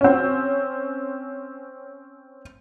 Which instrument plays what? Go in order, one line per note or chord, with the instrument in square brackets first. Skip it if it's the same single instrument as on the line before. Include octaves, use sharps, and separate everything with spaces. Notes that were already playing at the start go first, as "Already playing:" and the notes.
[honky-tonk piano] C4 C#4